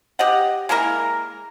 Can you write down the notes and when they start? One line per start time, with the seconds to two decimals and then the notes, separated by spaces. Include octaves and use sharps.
0.19 G4 D#5 F#5
0.69 G#3 A#3 E4 A#4